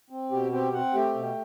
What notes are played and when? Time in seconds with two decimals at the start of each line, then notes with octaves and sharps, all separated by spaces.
0.10 C4
0.31 B2 G4
0.52 C4 G4
0.73 C4 F#5
0.94 A3 G4
1.15 B2